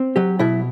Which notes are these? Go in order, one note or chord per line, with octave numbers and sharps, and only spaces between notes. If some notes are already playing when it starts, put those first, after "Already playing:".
Already playing: C4
F#3 G4
B2 E4